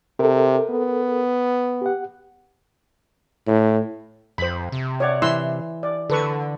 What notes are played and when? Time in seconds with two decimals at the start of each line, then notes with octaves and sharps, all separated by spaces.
0.19 C3 A4 A#4
0.70 B3
1.81 G4 F#5
3.47 A2
4.38 F2 C5 B5
4.72 C3
5.00 C#5 D5 F#5
5.22 E3 C6 E6
5.83 D5
6.10 D3 A4 B4 C#6